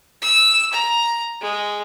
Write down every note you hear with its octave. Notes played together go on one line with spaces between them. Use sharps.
E6
A#5
G#3